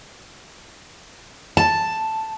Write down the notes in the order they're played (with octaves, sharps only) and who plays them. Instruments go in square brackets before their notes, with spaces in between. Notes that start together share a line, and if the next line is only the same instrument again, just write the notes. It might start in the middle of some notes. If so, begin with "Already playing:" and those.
[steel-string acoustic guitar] A5